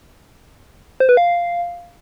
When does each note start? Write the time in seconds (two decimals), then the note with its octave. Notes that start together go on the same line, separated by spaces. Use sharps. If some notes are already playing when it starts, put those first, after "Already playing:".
1.00 C5
1.09 B4
1.17 F5